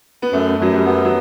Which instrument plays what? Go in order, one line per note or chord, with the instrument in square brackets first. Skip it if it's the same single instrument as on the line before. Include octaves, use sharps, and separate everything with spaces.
[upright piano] B3
[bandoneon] F#2 [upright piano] A3
[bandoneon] F#2 [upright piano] F#3
[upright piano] G3
[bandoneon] B3
[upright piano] F#3